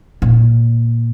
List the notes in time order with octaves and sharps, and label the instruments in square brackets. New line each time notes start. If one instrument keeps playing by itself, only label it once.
[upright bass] A#2